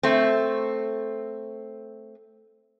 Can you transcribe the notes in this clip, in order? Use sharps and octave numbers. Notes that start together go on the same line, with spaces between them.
A3 C4